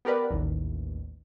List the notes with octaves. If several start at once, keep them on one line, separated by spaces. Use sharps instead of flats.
B3 G4 A#4 B4 D5
A1 D#2